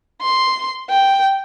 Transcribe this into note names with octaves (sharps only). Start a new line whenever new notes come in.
C6
G5